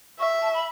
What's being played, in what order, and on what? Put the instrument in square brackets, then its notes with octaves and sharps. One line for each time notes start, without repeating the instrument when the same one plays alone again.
[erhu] E5 [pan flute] C#6
[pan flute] A5
B5